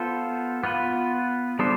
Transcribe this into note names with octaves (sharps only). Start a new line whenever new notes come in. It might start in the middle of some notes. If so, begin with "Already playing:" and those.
Already playing: B3 F4 A4 C5
B3 F4 B4
G3 B3 D4 A4 C5